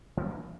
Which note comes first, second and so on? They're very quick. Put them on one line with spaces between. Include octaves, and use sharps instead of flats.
E3 G#3 D4 A#3